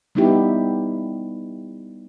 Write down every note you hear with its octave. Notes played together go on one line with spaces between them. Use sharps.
G3 B3 D#4 E4 G4